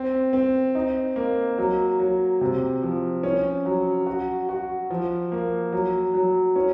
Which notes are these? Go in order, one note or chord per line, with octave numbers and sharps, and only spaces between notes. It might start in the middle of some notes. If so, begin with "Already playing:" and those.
Already playing: C4
C4
D#4
A#3
F#3
F#3
C3
F3
C#4
F#3
F#4
F#4
F3
A#3
F#3
F#3
C#4